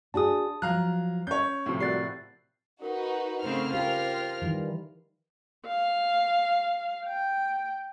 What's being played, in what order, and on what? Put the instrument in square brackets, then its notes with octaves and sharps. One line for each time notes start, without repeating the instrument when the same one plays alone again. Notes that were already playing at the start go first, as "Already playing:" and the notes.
[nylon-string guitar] D4 F#4 G#4 [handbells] A5 D#6
[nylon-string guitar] F3 F#3 [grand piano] F5 A#5 F6 [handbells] F#6
[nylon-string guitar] C#4 [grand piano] C#5 G6
[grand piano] A2 C3 F3
[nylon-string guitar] F#4 A#4 D5 [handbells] F#6 A6 C7
[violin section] D#4 F#4 B4 [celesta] A#4 F#5
[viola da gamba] C#3 A3 C4 [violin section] C5 F6
[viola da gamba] F4 A#4 [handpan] G4 [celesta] F5 G5 A5
[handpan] D#3 E3 G3 [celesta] D#4
[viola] F5
G5